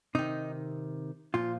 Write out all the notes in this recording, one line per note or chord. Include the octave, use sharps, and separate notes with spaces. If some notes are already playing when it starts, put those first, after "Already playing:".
C3 D#3 D#4
A#2 F3 F4